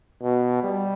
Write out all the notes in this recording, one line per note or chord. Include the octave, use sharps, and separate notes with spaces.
B2
G3